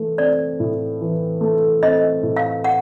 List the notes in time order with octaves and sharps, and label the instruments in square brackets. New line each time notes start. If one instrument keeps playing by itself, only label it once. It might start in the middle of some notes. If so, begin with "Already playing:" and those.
Already playing: [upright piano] E3 A3
[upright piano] C4 [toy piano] D5
[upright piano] A2
E3
A3
[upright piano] C4 [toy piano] D#5
[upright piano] A2
[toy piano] F5
F#5